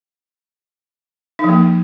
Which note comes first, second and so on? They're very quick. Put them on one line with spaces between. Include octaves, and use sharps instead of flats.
D#4 F3 A#3